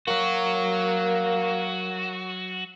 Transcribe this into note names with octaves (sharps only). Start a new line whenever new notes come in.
F#3 A#3 F#4